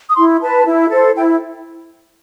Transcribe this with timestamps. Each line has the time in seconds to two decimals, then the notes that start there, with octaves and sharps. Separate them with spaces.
0.09 D#6
0.17 E4 C6
0.42 B4 A5
0.66 E4
0.91 A4 C5
1.16 E4 G5